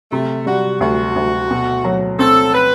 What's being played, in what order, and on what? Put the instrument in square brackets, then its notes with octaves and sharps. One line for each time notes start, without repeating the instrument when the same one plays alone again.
[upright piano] C3 [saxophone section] A3
[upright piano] G3 [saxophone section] F#4
[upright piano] D2 [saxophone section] F#4
[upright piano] D2
B2
F#3
[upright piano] C4 [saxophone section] A4
[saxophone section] B4